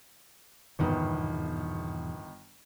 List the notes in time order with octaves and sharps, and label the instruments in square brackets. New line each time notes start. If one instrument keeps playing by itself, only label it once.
[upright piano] G1 D#3 B3 [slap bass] E2 G#2 B2